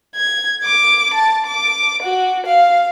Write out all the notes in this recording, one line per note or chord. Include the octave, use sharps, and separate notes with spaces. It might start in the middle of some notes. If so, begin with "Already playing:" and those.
G#6
D6
A5
D6
F#4
F5